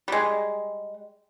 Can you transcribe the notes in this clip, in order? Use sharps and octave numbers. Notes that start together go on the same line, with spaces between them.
G3 G#3